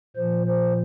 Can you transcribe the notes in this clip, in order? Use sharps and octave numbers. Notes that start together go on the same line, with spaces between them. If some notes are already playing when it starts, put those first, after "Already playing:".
A#2 F3 C5
C5